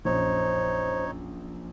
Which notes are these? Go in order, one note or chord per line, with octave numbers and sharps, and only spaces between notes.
A#1 F#2 D#4 C5 C#5